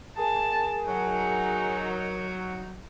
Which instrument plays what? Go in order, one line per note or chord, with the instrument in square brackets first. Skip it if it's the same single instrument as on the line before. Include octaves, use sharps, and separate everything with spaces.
[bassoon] G#4 [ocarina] A#4 [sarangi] A5
[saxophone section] F#3 [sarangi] D#4